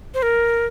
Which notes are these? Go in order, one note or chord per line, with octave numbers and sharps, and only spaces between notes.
C5
A#4